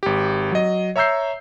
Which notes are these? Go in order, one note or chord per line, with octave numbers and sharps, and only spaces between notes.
G#1 G4
F#3 D#5
C#5 E5 A#5 E6 G6 C7